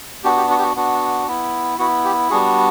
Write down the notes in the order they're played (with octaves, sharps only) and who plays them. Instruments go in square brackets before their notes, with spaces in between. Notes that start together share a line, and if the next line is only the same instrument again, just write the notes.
[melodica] B3 D4 F#4 G4
G4
F#4
G4
F#4
B3 D4 F#4
B3 E4
B3 E4 F#4
G4
G3 B3 D4 F#4 G#4